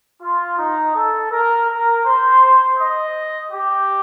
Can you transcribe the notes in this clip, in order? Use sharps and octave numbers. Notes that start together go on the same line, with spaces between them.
F4
D#4
A4
A#4
A#4
C5
D#5
G4